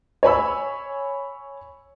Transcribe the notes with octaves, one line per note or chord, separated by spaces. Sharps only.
C#5 G#5 B5 E6